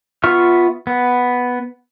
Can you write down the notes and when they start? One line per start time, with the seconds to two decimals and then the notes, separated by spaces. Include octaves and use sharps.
0.24 B3 F4 E5 C#6 F6
0.87 B3